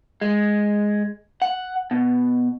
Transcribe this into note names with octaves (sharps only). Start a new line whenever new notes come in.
G#3
F#5
B2